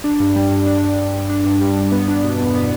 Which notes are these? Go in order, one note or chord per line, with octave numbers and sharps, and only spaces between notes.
D4
G2
G3
G2
D4
G2
G3
G2
D4
G2
G3
G2
B3
D4
B2
E2
B3